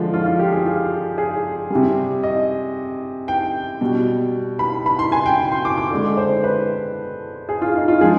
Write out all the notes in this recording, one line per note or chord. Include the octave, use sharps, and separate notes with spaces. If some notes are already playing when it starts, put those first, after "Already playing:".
Already playing: D3 F3 G#3 F4
F4
F4
G4
G#4
F4
G#4
C3 G3
D#5
G5
B2 G3
B5
B5
C6
G#5
G5
C6
D6
D6
D3 G#3
C5
B4
G#4
F4
D#4
F4
F3 G#3 G#4